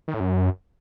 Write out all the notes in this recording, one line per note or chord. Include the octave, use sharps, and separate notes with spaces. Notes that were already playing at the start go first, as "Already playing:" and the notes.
D#3
A2
F#2